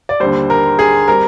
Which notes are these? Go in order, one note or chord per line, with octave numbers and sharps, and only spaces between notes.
D5
D#2 D3 G3 C5
A#4
G#4
G3 C4 A#4